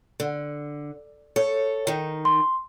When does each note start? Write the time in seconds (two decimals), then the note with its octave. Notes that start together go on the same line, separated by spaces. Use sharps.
0.20 D3
1.36 A4 C#5
1.87 D#3 D#4
2.25 C6